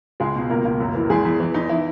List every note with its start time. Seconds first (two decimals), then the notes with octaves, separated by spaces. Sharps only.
0.20 C#2 G#3 G#4
0.36 B2
0.50 C#2 A#3 A#4
0.65 C#2
0.80 F#2
0.95 E3
1.10 E2 G#3 G#4
1.25 E2
1.40 E3
1.54 E2 D#4
1.69 E3 E4